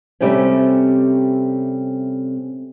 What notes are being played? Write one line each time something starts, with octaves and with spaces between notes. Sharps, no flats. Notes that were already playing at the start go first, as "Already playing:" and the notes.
C3 G3 A3 C4 C#4